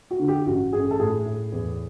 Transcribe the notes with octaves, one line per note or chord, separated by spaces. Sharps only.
F#4
D3
G4
A1 F#4
A1 G#4
A4
A2 G#4
A2
E2